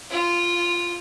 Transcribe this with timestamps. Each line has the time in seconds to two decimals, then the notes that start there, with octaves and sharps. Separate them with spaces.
0.10 F4